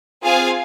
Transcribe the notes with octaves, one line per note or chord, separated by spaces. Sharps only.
C4 F4 G#4 F5 G#5